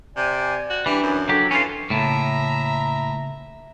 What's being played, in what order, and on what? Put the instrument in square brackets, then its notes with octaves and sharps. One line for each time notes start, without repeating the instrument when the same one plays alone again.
[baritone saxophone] C3 [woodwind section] D5 G#5
[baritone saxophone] F#4
[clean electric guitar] E3 [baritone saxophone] G3 [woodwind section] D4
[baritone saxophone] F#2
[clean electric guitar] F#3 G4 [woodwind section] D4 A4
[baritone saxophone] E3 [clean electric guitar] C#4 F4
[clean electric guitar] A2 [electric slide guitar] C#3 A#3 A5 [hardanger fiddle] E5 A#5